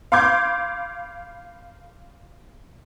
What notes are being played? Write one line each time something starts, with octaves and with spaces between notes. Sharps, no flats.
F5 B5 C6 D6 G6 G#6